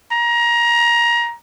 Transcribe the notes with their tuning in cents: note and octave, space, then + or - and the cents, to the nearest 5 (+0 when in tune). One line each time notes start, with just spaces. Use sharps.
A#5 +20